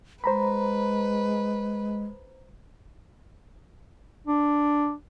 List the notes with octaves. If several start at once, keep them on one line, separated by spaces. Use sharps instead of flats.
G#3 B4 C5 A#5 B5
D4